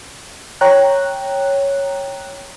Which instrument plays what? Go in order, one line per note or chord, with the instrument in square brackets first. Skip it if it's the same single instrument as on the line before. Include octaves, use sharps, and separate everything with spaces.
[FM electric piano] C#5 G5 A#5 F#6